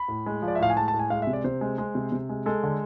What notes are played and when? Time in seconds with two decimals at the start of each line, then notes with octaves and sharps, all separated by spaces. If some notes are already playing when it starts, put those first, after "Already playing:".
Already playing: B5
0.08 A2
0.26 G#3
0.42 F3
0.48 D5
0.55 E5
0.59 A2 F5
0.70 G#5
0.76 G#3 A5
0.88 A5
0.94 A2
0.99 G#5
1.10 G#3 F5
1.22 E5
1.27 C3
1.33 D5
1.44 C3 C5
1.61 G#3
1.78 G#3
1.95 C3
2.12 C3
2.29 G#3
2.46 G#3 A4
2.63 D3